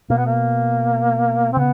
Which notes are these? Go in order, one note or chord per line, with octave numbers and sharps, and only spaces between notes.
B2 A#3
B3
A#3
C4
C#3 B3